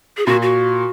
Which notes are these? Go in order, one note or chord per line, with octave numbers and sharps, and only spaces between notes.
G#4
A#2 F#4
F#4